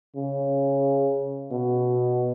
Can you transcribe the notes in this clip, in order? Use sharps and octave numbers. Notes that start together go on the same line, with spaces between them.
C#3
B2